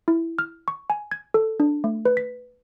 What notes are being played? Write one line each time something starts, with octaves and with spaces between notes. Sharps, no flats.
E4
F6
C#6
G#5
G#6
A4
D4
A3
B4
B6